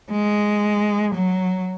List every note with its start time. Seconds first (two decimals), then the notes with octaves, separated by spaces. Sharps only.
0.11 G#3
1.15 F#3